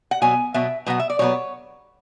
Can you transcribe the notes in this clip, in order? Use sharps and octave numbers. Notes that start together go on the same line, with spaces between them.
F#5
B2 F#3 B3 G#5
B2 F#3 B3 E5
B2 F#3 B3 F#5
E5
D5
B2 F#3 B3 C#5